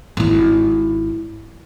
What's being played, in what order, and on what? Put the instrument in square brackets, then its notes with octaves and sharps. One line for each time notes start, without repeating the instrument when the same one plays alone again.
[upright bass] G#1 E4